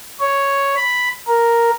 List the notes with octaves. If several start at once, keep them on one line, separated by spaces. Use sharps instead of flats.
C#5
B5
A#4